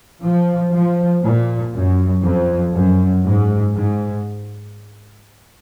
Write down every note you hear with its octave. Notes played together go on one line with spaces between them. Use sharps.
F3
F3
A#2
F#2
F2
F#2
G#2
G#2